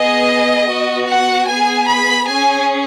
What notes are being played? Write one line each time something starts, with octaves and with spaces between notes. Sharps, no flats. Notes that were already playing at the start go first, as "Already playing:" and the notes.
Already playing: B3 G#4 D#5
B3 F#4
F#5
B3 G#4 G#5
B5
C#4 G#4 G#5